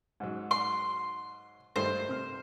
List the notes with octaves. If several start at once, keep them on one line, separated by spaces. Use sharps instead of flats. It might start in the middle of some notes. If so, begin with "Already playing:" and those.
G#2 F#3
C6
G2 D#3 A3 C5
C3 F6